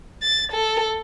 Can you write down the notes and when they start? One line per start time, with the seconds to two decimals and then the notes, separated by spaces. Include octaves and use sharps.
0.23 A6
0.52 A4